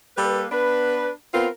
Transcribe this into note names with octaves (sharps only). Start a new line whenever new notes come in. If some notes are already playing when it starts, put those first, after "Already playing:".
G3 A#3 A4 B4
B3 D4 B4
B3 C4 F4 A#4 B4